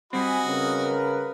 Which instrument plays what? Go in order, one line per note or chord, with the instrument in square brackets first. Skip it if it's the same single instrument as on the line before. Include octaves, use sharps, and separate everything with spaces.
[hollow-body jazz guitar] G3 C4 [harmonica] F#4 D#5 [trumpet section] G#5 B5
[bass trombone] C#3 [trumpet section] A#4 B4